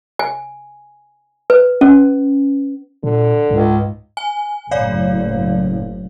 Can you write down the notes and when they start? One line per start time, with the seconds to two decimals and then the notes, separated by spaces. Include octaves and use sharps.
0.19 G#5
1.50 B4
1.81 C#4
3.04 A#2 D3
3.51 C#2 G#2
4.17 G#5
4.71 F#1 A2 C#5 D5 F5